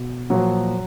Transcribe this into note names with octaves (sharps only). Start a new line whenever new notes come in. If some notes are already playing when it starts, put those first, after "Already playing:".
Already playing: B2
A#2 F3 F#3 F#4